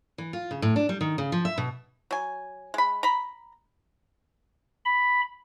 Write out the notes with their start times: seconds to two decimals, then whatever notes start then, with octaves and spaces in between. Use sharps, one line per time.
0.18 E3
0.33 F4
0.51 C#3
0.62 A2
0.76 D4
0.89 G3
1.01 D#3
1.18 C#3
1.32 F3
1.45 E5
1.58 B2
2.11 F#3 G#5
2.74 G#3 B5
3.03 A#5 B5
4.85 B5